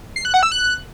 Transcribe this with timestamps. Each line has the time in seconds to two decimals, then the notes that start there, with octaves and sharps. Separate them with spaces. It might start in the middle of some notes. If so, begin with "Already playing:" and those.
0.16 C7
0.25 F#6
0.34 F#5
0.43 E6
0.52 F#6